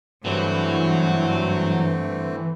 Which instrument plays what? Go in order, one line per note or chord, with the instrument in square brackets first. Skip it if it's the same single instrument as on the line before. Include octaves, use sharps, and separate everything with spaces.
[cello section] G2 [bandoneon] D3 A3 C4 [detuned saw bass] E3 [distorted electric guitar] F#3